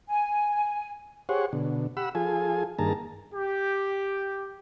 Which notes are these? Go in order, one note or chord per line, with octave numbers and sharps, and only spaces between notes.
G#5
G4 G#4 C5 C#5 F#5
B2 D3
G4 F#5 B5 E6
F3 F4 G#4 A4 G#5
G2 D#3 A#3 G#4 A5 A#5
G4